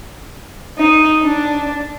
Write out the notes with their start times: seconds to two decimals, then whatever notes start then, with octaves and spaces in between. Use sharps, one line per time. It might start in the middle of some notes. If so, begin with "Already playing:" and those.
0.77 D#4
1.23 D4